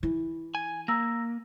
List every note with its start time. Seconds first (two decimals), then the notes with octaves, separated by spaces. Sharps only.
0.03 E3
0.55 G#5
0.88 A#3 A#5 E6 A#6